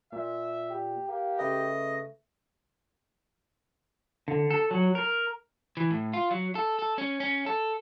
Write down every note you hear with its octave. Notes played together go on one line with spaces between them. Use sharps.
A#2 E5
G4
A#3 G4
C#3 A3 B4 D#5
D3
A4
F#3
A#4
E3
A2
F4
F#3
A4
A4
C#4
C#4
A4